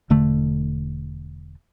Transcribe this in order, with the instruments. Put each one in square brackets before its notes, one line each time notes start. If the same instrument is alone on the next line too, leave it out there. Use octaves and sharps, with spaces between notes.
[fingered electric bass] E1 D3 A3